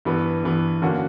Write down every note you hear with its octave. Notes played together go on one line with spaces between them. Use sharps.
G2 E3 B3
G2 E3 B3
D3 A#3 C#4 F#4